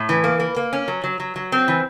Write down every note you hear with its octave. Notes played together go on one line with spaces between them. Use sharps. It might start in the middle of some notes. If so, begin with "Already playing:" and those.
Already playing: A2
E3
A#3
A#3
A#3
C#4
F#3
F#3
F#3
F#3
C4
E3